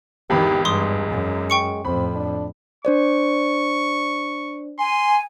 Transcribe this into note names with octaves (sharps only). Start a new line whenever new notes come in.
G#1 E2 D#3 G4 B5
G2 G#3 C6 D6 D#6
F#2
G5 C#6 C#7
F2 A2 C4 B5
D4
D4 C5 D5 C#6
G#5 C6